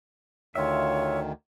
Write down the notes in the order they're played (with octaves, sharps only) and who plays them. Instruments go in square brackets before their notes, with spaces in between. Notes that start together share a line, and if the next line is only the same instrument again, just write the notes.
[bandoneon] D2 D#3 [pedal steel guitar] F4 E5 [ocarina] C#5